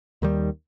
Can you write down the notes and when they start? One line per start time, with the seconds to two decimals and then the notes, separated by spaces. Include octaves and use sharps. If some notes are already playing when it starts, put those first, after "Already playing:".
0.22 D#2 D#3 G3